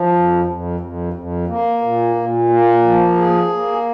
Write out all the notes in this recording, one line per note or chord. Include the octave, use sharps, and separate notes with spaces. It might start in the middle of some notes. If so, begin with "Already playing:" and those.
Already playing: F3
F2
F2
F2
F2
A#3
A#2
A#2
A#3
F3
G#4
A#3